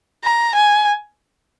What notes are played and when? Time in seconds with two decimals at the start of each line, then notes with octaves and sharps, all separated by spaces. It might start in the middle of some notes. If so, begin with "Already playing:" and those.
0.24 A#5
0.55 G#5